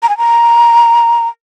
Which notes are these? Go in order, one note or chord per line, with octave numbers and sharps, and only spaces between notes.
A#5
G#5
A#5